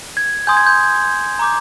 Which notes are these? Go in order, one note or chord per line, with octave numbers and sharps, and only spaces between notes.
G#6
G#5 C6 D#6 G6
G#6
G6
A#5 D6 G6